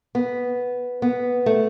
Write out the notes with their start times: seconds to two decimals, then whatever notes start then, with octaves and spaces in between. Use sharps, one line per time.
0.15 B3
1.02 B3
1.46 A3